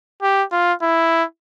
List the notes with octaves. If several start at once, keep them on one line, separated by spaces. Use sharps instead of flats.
G4
F4
E4